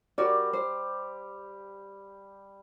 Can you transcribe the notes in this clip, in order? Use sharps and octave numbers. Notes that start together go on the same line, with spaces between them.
G3 F#4 G4 A#4 D5
C5